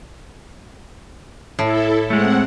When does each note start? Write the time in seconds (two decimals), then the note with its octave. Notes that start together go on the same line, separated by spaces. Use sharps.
1.59 A2 E4 A4
2.10 G#3 A3 C4 F#5